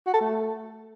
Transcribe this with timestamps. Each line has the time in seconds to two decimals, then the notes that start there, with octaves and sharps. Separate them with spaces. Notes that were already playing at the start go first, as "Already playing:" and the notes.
0.07 F#4
0.14 A4
0.21 A3